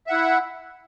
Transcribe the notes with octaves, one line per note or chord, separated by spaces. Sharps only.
E4 E5 F#5